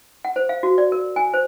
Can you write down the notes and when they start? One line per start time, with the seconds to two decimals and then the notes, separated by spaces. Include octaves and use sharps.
0.25 F#5
0.36 C5
0.49 F5
0.63 F#4
0.78 D5
0.92 A#4
1.16 G#5
1.34 C5